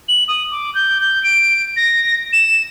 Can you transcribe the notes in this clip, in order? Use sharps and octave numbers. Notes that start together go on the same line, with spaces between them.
F#7
D#6
D6
G6
G6
D7
A#6
E7